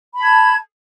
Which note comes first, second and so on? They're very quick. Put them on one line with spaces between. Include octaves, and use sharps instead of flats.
B5 A5 G#6